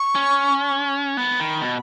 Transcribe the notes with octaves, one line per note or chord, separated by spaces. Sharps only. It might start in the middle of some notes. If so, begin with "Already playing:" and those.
Already playing: C#6
C#4
B3 B5
D#3
B2